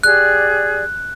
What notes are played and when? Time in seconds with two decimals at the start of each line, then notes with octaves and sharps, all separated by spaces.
0.03 G4 G#4 D5 F#6